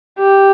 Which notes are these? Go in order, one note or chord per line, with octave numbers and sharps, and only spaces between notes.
G4